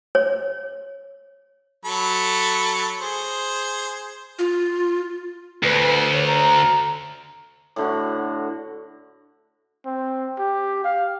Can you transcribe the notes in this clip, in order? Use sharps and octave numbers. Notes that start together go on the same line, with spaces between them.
C#5
F#3 A4 B5
G#4 C5
F4
D2 B4
C#5
A#5
A2 D3 F#4
C4
G4
F5